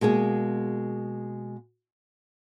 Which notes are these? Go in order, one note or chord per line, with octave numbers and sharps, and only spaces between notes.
B2 G#3 A#3 G#4